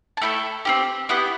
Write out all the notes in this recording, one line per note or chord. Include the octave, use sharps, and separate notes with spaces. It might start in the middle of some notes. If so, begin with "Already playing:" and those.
A5
A3 E4 A4 G5
C4 E4 G4
B3 E4 G4 F#5